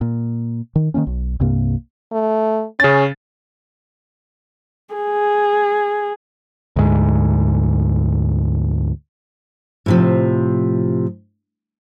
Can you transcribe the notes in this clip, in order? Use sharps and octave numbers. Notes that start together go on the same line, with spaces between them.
A#2
D#3
D#3 A3 A#3 C#4
B1
C2 G2 C3 A#3
A3
C#3 C#4 A6
G#4
D2 G#2
A2 C3 F3